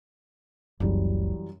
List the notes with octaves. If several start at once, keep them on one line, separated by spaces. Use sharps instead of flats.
F#1 C#2 F#2 E3 G3